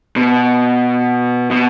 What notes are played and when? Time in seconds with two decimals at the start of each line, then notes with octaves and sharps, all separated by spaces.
0.16 B2
1.51 B2